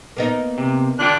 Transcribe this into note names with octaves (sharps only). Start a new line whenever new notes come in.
A#3 B3 D#4
C3
D3 D4 F4 G5 F#6